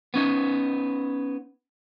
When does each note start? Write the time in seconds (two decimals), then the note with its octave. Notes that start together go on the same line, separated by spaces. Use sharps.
0.14 B3 C#4 D#4